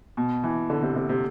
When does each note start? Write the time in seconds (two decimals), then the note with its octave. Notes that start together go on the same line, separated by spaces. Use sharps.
0.17 B2
0.44 E3
0.70 D3
0.82 C3
0.96 C3
1.09 C3